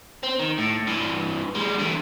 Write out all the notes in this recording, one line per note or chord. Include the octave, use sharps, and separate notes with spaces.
C4
D#3
A2
G2 E3
G3 G#3
D3 E3